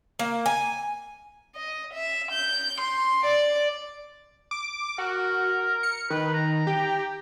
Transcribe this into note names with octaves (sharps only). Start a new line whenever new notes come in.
A#3
G#5
D#5
E5
G6
C6
D5
D6
F#4 A#4
C#7
D#3 B4
A#5
G4